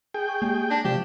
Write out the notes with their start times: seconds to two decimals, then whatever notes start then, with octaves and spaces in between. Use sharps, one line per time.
0.14 G#4 G5
0.29 C#6
0.42 G#3 A#3 G4
0.71 D4 A#6
0.85 C3 F3 G#3 G4 E7